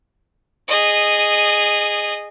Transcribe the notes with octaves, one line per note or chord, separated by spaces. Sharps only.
G#4 D#5